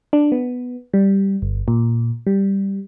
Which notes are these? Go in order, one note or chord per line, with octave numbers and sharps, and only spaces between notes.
D4
B3
G3
G1
A#2
G3